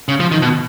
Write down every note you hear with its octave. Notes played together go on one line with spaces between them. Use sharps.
C#3
F3
D#3
B2